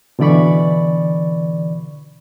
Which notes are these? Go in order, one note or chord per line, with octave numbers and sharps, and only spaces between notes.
B2 D3 E3 D5 B5 C#6